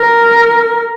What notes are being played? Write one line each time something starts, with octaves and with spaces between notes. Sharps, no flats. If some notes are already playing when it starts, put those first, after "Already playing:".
Already playing: A#4